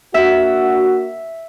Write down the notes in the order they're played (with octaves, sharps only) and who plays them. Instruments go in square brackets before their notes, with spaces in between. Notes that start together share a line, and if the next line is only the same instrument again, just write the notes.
[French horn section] A#3 D4 F#4 [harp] E5